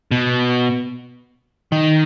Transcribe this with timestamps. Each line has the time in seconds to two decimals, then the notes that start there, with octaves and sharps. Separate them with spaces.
0.11 B2
1.72 D#3